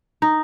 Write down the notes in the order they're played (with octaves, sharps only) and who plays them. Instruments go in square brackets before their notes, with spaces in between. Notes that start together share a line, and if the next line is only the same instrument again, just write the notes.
[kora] D#4